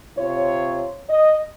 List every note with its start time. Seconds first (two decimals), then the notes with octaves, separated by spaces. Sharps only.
0.17 C3 F4 C#5
1.08 D#5